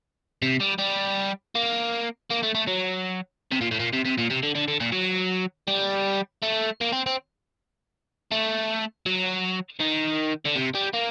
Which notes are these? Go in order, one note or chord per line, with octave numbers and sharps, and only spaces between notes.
C3
G3
G3
A#3
A#3
A3
A3
F#3
C3
A#2
A2
A#2
C3
C3
A#2
C3
D3
D3
D3
A#2
F#3
G3
A3
A#3
C4
C4
A3
F#3
D#3
D3
C3
G3
A#3